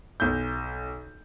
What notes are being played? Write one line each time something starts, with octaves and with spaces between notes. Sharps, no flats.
B1 G6